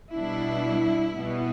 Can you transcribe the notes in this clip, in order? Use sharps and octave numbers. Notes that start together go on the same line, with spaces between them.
B2 G3 D4 E4
B2 G3 B3